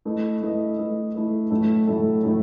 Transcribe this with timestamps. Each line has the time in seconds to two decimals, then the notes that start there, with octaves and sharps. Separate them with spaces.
0.05 A3 E4 B4 D#5
0.42 A3 E4 B4 D#5
0.78 A3 E4 B4 D#5
1.14 A3 E4 B4 D#5
1.50 A2 F#3 A3 E4 A4
1.87 A2 F#3 A3 E4 A4
2.23 A2 F#3 A3 E4 A4